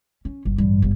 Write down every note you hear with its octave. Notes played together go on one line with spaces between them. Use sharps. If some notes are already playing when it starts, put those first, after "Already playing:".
C#4
G1
A1 G2
G1 C#3